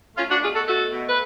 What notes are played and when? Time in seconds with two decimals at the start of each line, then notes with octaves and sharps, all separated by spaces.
0.16 A3 C#4 F4
0.30 D4 F#4
0.42 B2 F4 G#4
0.54 F#4 A4
0.67 A3 F#4 A4
0.92 B2
1.08 B4